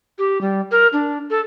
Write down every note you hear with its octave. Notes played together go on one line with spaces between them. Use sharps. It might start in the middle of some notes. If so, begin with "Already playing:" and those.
G4
G3
A#4
D4
A4